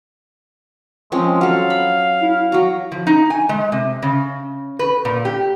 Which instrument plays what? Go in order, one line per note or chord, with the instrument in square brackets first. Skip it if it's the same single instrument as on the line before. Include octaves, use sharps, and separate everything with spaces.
[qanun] F3 C4 C#4 [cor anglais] G#3
[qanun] F#3 A4 [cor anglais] F5
[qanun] B5
[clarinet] E4
[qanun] F#3 A#5 [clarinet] F#4
[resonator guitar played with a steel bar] F3
D#4
G#5
G#3
C3
C#3
B4
A#2
G4